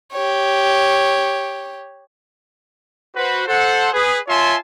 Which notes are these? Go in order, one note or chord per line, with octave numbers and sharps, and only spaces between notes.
G4 C#5
F#4 B4 C5
A4 C5 F#5
G#4 B4
F4 C#5 E5 G#5 A5 C6